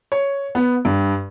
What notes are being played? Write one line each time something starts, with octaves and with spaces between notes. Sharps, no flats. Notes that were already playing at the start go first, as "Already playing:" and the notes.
C#5
B3
G2